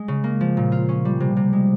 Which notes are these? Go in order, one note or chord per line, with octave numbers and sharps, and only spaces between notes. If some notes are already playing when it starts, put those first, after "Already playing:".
Already playing: G#3
C#3
A#3
F3
A#2
F4
C#4
G3
C3
C3
G#3